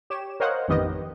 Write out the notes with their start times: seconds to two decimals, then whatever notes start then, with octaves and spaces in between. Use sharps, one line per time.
0.10 G4 C#5 E7
0.40 A#4 C5 C#5 D#5 F5 F#5
0.68 A1 F2 D#3 B3 G4 D#5